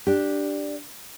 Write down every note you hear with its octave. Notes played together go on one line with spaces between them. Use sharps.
D4 G4